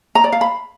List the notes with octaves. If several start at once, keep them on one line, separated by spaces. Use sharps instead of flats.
A#5
D5
F5
B5